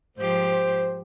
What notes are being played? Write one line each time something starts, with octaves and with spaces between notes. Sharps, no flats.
G#2 F3 G4 C5